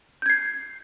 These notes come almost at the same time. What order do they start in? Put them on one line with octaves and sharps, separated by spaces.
G6 G#6 C7